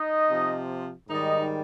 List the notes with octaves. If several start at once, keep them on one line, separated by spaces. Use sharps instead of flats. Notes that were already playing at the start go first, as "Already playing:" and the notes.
Already playing: D#4 D#5
C3 F3
G#2 D#3 G3 D#4 D#5